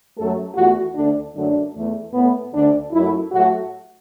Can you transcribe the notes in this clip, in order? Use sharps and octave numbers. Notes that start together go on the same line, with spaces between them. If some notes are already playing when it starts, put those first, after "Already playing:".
F#2 F#3 A3 A4
E2 E3 A3 F#4
D2 D3 A3 D4
F#2 D3 F#3 A3 D4
E2 E3 A3
A2 A3 B3
D2 D3 A3 D4
F#2 F#3 A3 E4
A2 F#3 A3 F#4